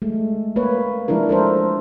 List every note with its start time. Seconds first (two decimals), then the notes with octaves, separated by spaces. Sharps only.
0.02 G#3 A3
0.56 A#3 B4 C#5
1.08 F3 G#3 D4 E4 A#4
1.29 A4 A#4 C5